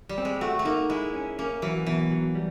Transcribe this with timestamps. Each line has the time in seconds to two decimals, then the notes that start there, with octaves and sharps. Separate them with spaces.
0.09 G3
0.18 C4
0.25 G#3
0.41 A3 F#4
0.59 A3
0.65 A#3 D#4
0.89 G#3 E4
1.14 C#4
1.38 A#3 C#4
1.62 E3 F#3
1.86 B2 E3
2.11 F#3
2.35 G3